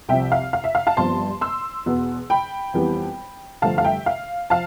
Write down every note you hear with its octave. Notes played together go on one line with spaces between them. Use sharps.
C2 C3 F3 E5 G5
F5
F5
E5
F5
F5 A5
G1 G2 F3 C4 A5 C6
C6 E6
E2 B2 B3
G5 B5
F2 E3 G3 B3
G2 D3 F3 A3 F5 A5
F5
E5 G5
F5
F3 F5 A5